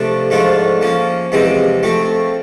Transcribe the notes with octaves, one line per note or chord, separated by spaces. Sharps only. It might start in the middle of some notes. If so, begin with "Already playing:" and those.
Already playing: C3 F3 A3 D4
G#2 F3 A3 D4 F4
F3 A#3 C#4
E2 C3 F3 G#3 C4
F3 A3 C4